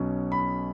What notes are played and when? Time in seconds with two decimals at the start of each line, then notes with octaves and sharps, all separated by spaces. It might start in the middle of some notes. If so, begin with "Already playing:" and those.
Already playing: B1 B2 F#3 C#4
0.32 B5